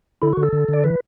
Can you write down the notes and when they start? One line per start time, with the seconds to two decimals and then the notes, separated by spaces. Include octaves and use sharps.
0.22 D3 E4
0.33 D3 F#4
0.43 A4
0.53 D3
0.68 D3 D5
0.84 E3 B4